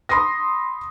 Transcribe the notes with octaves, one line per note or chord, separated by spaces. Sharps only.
B5 C6 D#6 A#6